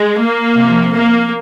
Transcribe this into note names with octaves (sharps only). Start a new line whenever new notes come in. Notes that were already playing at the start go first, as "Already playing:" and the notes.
Already playing: G#3
A#3
C3 F3
A#3